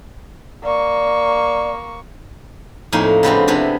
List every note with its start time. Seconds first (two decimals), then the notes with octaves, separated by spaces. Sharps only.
0.63 A#3 D5 C#6
2.92 F2 A2 A#3 D#4 G#5
3.23 C#3 B3 C4 D4
3.48 C3 B3 D4 E4